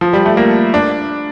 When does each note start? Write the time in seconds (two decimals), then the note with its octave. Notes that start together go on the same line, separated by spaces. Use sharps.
0.01 F3
0.13 G3
0.26 A3
0.37 A#3
0.74 D4